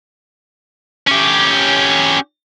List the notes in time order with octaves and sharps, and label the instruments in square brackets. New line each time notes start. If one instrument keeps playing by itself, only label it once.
[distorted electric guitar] C#4 G4